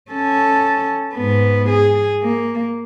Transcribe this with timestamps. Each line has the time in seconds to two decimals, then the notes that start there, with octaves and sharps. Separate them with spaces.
0.11 C#4 A4
1.13 G#2 B3
1.69 G#4
2.22 A#3